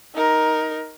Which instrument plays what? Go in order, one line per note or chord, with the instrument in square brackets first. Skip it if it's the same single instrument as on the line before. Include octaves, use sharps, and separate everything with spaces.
[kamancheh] D#4 A#4